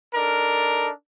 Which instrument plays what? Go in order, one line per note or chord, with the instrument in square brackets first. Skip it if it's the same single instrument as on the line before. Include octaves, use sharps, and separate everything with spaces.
[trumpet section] D4 D#4 A4 A#4